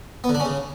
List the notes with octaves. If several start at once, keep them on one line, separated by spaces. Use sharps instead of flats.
B3
D3
D4
C#4
C#3